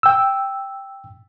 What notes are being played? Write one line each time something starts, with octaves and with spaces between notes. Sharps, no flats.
G5 E6